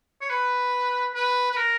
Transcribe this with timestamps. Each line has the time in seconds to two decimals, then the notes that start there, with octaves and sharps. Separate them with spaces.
0.21 C#5
0.30 B4
1.14 B4
1.51 B4
1.57 A#4